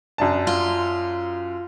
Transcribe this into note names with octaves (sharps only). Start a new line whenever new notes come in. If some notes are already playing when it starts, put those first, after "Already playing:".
F#2 D4 A5
F4